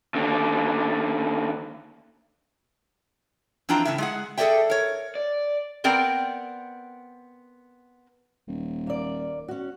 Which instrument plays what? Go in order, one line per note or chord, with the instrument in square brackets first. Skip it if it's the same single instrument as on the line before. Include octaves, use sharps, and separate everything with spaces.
[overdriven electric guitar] D#2 D3
[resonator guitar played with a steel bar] F2 E3 D4 F4 G5 A#5
A2 C#3 E5
G#3 G#4 F#5
G#4 A4 C#5 D5 E5 G5
A#4 C#5
[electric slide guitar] D5
[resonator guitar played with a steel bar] B3 C4 A#4 D5 G5
[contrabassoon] D#1
[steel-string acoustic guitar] A#3 D5
C#4 F#4